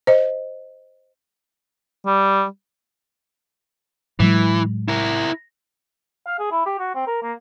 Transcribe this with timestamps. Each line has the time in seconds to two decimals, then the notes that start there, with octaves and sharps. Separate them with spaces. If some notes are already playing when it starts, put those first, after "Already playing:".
0.07 C5 D#5
2.06 G3
4.20 A2 E3 F#3 G#3
4.88 E4 A#4
6.27 F5
6.39 G#4
6.51 E4
6.66 G4
6.79 F#4
6.95 C4
7.07 A#4
7.22 A#3